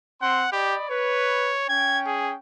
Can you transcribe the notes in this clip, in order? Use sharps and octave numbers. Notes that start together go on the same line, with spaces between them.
C4 F#5 C6
G4 D5 D#5 B5
B4 C#5
C#4 G5 G#6
G#4